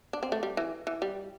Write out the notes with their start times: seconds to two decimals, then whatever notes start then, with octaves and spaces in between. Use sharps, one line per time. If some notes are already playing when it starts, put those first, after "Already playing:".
0.13 D4
0.23 C4
0.32 A3
0.43 G3
0.57 E3
0.87 E3
1.02 G3